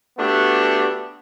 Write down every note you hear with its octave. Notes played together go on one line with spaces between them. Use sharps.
A3 B3 D4 F#4 G4